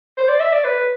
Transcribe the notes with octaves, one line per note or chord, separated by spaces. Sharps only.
C5
D5
E5
D5
B4